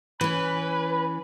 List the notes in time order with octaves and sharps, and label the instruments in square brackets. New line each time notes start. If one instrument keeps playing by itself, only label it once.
[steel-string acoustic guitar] E3 C#4 [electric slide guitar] B4 [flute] B5